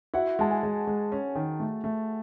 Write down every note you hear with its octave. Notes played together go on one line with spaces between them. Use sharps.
E4 F#4 F#5
G#3 A5
G#4 G#5
G#3
G#3
C#4
D#3
A3
A3